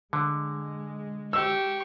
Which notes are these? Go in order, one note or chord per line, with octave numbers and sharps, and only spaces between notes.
D3 G#3
G4 C#6 E6